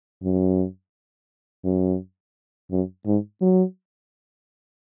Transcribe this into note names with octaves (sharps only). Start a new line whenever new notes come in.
F#2
F#2
F#2
G#2
F#3